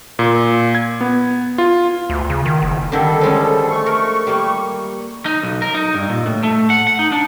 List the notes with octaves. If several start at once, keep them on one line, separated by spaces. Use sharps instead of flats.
A#2
G#6
B3
F4
D2
C#3
D#3
F#1
D3 D#3 G3 A4
F3 G#3 C#4
A3 C#6
A#4
G3 A#3
D#4
B1
A#4
D#4
G2
A#2
A2
A3
F#5
F#5
D#4
D4